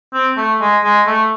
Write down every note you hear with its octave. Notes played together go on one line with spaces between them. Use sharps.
C4
A3
G#3
G#3
A3